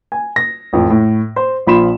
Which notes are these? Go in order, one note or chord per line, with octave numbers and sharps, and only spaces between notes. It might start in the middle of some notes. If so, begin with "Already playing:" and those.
G#5
A#6
A1 F2
A2
C5
A#1 F3 B5 C6 E7